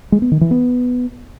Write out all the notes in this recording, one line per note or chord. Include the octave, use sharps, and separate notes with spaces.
G#3
B3
D#3
E3
B3